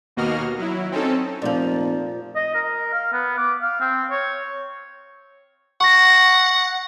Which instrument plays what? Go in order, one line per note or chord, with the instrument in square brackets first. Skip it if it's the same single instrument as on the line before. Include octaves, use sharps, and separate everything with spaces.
[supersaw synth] D#2 B2 A#3 F#4 D#5 F6
F#3 E4
C4 C#4 D#4 A4
[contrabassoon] F1 [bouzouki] A#2 F3
[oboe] D#5
A#4
F5
B3
D6
F5
C4
C#5
[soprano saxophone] F#5 [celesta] C#6 A#6